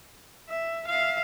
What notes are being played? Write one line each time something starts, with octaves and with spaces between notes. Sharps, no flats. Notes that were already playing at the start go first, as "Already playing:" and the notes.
E5
E5 F5